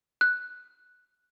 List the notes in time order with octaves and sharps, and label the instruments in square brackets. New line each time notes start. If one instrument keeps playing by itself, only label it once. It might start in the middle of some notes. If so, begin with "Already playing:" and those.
[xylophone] F#6